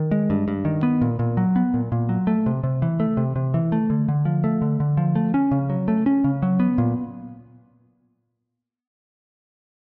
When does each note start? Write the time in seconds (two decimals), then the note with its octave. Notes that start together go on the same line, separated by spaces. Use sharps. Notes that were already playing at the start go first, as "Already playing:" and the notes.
Already playing: D#3
0.11 G#3
0.30 G2
0.48 G2
0.65 D#3
0.83 B3
1.02 A#2
1.19 A#2
1.37 F#3
1.56 B3
1.74 A#2
1.92 A#2
2.09 F#3
2.27 A3
2.46 C3
2.64 C3
2.82 E3
3.00 A3
3.17 C3
3.36 C3
3.54 E3
3.72 A3
3.90 D3
4.08 D3
4.25 F3
4.44 A3
4.62 D3
4.80 D3
4.97 F3
5.15 A3
5.34 C#4
5.51 C#3
5.70 F#3
5.88 A3
6.06 C#4
6.24 C#3
6.42 F#3
6.60 B3
6.78 A#2